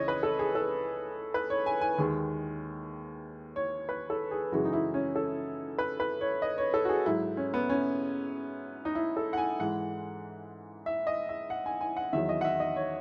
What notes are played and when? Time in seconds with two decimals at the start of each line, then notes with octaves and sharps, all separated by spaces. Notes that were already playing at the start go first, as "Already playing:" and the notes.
Already playing: C#2 C#3 E3 C#5 D#5
0.08 B4
0.23 A4
0.39 G#4
0.55 A4
1.34 B4
1.50 C#5
1.66 G#5
1.81 G#5
1.98 D#2 D#3 G#3
3.56 C#5
3.89 B4
4.10 A4
4.31 G#4
4.52 F#2 C#3 E3 G#3 F#4
4.65 D#4
4.73 E4
4.94 C#4
5.16 A4
5.78 B4
6.00 B4
6.21 C#5
6.42 D#5
6.58 C#5
6.74 A4
6.85 F#4
6.89 G#4
7.05 G#2 F#3 E4
7.37 C#4
7.54 B3
7.70 C#4
8.85 D#4
8.95 E4
9.17 A4
9.33 F#5
9.37 G#5
9.60 G#2 E3 G#3 F#5
10.86 E5
11.07 D#5
11.29 E5
11.50 F#5
11.66 G#5
11.81 G#5
11.97 F#5
12.13 E2 D#3 F#3 E5
12.29 D#5
12.41 F#5
12.45 E5
12.60 D#5
12.76 C#5